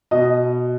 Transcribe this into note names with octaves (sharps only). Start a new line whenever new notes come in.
B2 D#5